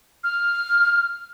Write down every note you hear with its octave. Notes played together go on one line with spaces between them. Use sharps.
F6